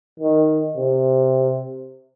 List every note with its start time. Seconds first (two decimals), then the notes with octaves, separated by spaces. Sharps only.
0.20 D#3
0.77 C3